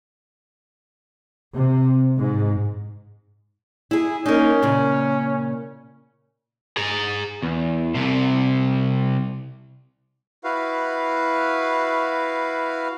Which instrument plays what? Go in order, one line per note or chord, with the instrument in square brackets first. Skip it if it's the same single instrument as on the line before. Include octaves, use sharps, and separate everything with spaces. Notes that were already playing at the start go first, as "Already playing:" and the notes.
[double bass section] C3
G#2
[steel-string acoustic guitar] E4 G#4
[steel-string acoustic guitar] A#3 D#4 [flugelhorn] C#4
[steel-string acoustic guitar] A#2 C#3
[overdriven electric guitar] G#4 A#5
E2
C2 C3
[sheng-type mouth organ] E4 F#4 B4 F5